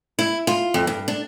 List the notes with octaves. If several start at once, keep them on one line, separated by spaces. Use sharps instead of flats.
E4
F4
F2
G2
D4